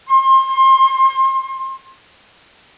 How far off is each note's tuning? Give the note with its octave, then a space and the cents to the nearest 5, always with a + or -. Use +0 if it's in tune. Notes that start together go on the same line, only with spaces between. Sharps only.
C6 +30